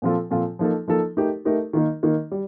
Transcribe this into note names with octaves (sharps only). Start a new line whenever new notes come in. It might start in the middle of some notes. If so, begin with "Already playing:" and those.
A#2 F3 C4 F4 A4
A#2 F3 C4 F4 A4
F3 A#3 D#4 A4
F3 A#3 D#4 A4
A3 D#4 G4 A#4
A3 D#4 G4 A#4
D#3 A#3 D#4
D#3 A#3 D#4
G3